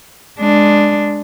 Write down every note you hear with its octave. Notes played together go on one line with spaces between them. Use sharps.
G#3 D4